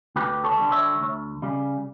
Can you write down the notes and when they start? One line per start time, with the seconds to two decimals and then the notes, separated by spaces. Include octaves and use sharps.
0.16 D2 G4 B4
0.44 A4 C#5
0.58 D3 G3
0.72 C#5 E5
1.00 D2
1.42 C#3 G3